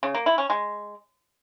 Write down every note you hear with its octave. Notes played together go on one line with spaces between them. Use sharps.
C#3
A#3
E4
C#4
G#3